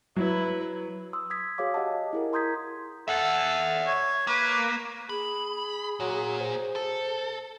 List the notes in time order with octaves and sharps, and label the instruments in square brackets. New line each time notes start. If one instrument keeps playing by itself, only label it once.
[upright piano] F#3 [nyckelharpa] E4 B4
[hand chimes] C6 D#6 E6
D#6 G#6 B6
F#4 G#4 C#5 F5 D6
G4 D#5 F#5 A5
E4 G#4 A#4
A#5 C6 D#6 G6 G#6 B6
[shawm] A4 [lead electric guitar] E5 F#5
[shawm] C#5
[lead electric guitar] A#3 [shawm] B4
[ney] G#4 [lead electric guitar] B5
[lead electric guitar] A#2 [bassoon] F#3
[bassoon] C5
[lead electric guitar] A4